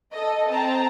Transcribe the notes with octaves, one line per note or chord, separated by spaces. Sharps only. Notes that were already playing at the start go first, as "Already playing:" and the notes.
A4 D#5
C4 A5 A#5